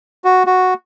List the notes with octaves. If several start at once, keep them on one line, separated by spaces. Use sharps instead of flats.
F#4
F#4